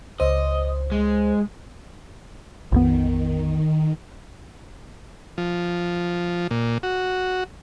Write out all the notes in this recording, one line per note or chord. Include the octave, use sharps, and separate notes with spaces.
C#2 C5 D#5
G#3
A#1 F2 D#3 B3
F3
A#2
F#4